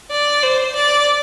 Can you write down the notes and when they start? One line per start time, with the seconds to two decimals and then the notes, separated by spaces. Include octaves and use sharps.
0.11 D5
0.43 C5
0.76 D5